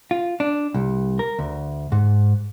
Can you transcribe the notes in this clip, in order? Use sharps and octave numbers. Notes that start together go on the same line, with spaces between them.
F4
D4
C2
A#4
D2
G#2